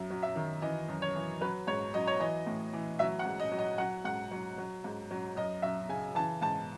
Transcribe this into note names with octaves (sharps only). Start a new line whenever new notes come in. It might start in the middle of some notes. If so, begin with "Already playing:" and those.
Already playing: F#2 F#3 E5
F#3
E5
D#3
E3 D#5
F#2
C#5
E3
F#3 B4
G#2 C#5
F#3 D#5
C#5
E3 D#5
A2
E3
F#3 E5
F#5
G#2
D#5
F#3
D#5
F#3 F#5
G#2 F#5
F#3
F#3
G#2
F#3
F#2 D#5
F#3 E5
C#3 G#5
E3 A5
G#2 A5